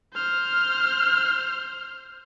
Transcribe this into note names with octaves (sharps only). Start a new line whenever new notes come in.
C5 F6